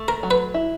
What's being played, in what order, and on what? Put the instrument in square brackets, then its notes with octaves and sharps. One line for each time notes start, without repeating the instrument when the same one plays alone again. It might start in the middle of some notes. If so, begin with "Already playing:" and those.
Already playing: [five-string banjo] A3
[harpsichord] A#4
[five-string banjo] F#3
[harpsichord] B4
[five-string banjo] E4